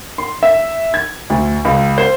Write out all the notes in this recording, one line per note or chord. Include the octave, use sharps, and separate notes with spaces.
C6
E5
G#6
D2
C#2
C5